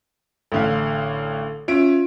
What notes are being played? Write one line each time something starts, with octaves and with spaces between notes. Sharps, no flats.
A1 D3 A4 F5
C#4 F4 E5 D7